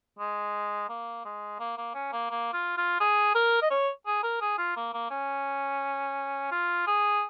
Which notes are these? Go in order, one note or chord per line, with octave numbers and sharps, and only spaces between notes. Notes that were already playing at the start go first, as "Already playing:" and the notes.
G#3
A#3
G#3
A#3
A#3
C#4
A#3
A#3
F4
F4
G#4
A#4
D#5
C#5
G#4
A#4
G#4
F4
A#3
A#3
C#4
F4
G#4